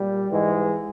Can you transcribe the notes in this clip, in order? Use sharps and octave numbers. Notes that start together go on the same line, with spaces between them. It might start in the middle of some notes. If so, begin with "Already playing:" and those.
Already playing: A#2 G3
G#2 E3 G#3